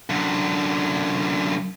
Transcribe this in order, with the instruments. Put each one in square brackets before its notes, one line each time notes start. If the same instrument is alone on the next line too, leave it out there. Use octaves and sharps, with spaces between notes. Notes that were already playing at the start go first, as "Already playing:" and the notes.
[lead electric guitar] F#2 D3